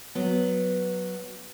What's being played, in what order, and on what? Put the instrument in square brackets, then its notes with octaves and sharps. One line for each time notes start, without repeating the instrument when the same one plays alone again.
[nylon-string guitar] F#3 B3